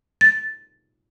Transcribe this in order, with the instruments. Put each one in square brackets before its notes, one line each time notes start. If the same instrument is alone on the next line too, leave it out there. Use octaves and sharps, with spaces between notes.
[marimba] A6